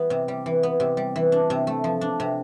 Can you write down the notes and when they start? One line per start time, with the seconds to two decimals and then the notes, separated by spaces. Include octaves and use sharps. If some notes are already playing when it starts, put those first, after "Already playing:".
Already playing: E3 G3 B3
0.10 C3
0.28 G3
0.46 E3
0.63 B3
0.80 C3
0.97 G3
1.16 E3
1.32 D4
1.50 C3
1.67 A3
1.84 F3
2.01 D4
2.20 C3